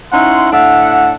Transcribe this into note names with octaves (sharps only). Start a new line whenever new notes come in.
C#4 D#4 E4 F#5 C6
A2 D4 E5 F#5